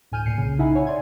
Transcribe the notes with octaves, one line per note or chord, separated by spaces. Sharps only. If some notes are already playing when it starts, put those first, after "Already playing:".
D2 A2 G#5 F6 G6 D#7
A#2 C7 C#7
C2 C#3
D#4 E4 E5 F#5 G#5 B5
C#5 G#5
D5 C6 G#6